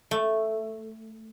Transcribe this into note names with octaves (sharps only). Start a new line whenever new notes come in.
A3